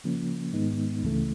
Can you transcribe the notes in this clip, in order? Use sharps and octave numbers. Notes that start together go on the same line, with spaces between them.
C#3 F3 A#3 C#4
G#2 D#3 G#3 B3 D#4
C#2 C#3 E3 A3